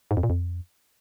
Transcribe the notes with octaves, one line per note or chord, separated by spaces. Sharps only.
G#2
F2
A#2
F2